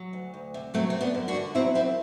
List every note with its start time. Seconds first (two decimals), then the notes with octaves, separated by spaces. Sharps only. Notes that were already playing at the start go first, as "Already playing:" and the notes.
Already playing: F#3
0.13 D2
0.34 D2
0.54 C3
0.74 F#3 A3 C4
0.90 F#2 C4
1.01 B3 D4
1.15 F#2
1.28 D4 F#4
1.35 D3
1.55 F#3 C4 E4
1.75 F#2 C4 E4